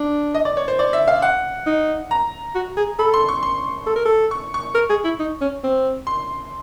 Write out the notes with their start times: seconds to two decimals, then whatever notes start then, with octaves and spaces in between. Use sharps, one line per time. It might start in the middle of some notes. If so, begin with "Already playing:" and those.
Already playing: D4
0.34 D#5
0.45 D5
0.57 C#5
0.68 C5
0.79 D5
0.93 E5
1.08 F5
1.22 F#5
1.67 D#4
2.11 A#5
2.55 F#4
2.77 G#4
2.99 A4 B5
3.14 C6
3.29 C#6
3.43 C6
3.87 A4
3.96 A#4
4.05 A4
4.31 C#6
4.54 C#6
4.75 A#4
4.90 G#4
5.04 E4
5.20 D#4
5.41 C#4
5.64 C4
6.07 C6